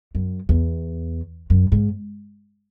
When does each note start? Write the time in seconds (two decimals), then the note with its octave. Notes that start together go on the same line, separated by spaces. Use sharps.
0.15 F#2
0.49 E2
1.50 F#2
1.72 G#2